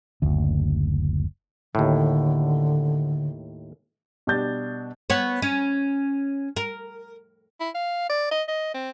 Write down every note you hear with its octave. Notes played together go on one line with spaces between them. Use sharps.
F#1 D2
D#2 A2 D3
B2 G3 D4 G6 A6
B3 C#5
C#4
A#4
E4
F5
D5
D#5
D#5
C4